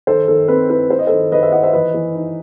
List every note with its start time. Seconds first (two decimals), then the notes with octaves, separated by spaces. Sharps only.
0.07 D#3 A4 C5
0.28 D#3 A4
0.48 C4 B4
0.70 E4 B4
0.90 E4 C5
0.99 D#5
1.07 D#3 A4 C5
1.32 D#3 B4 D#5
1.42 C5 E5
1.52 E4 D#5 F#5
1.63 C5 E5
1.73 E3 B4 D#5
1.94 E3
2.15 D#4